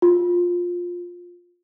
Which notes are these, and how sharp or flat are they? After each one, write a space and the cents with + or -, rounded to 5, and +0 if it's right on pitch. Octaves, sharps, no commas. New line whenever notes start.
F4 +15